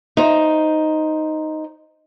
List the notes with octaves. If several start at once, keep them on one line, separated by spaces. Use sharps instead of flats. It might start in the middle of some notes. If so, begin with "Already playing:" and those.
D#4 C5